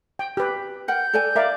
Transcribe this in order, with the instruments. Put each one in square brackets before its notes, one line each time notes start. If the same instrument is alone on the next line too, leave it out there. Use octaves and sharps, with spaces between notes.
[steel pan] G5
G4 B4
[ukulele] A#4 F#5 G5 [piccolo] G6
[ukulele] A4 D5 G#5
[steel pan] A#4 D5 [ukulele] E5 F5